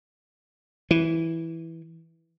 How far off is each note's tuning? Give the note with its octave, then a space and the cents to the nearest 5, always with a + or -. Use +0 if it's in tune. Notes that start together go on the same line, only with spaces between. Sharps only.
E3 -5